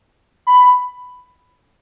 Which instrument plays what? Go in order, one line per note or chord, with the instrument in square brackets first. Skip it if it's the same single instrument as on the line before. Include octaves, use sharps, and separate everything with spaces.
[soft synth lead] B5